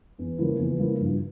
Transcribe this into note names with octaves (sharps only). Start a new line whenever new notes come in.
E2
C#3 F3 A#3 E4
E2
C#3 F3 A#3 E4
G2